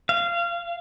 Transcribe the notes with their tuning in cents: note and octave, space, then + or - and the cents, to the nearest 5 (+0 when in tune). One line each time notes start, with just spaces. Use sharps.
F5 -20